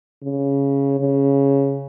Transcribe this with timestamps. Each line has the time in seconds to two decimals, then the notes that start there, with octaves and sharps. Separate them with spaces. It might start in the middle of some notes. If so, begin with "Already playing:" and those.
0.23 C#3
1.01 C#3